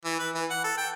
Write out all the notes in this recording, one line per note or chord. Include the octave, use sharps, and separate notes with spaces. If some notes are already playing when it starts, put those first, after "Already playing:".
E3
B4
E3
F#5
A4
G5